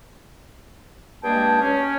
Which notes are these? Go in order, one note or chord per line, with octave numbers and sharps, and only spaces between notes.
G2 G#3 A#3 G#4 G5 A5
C#4